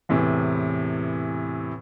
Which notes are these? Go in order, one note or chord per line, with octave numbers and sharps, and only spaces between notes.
E2 A2 C3 E3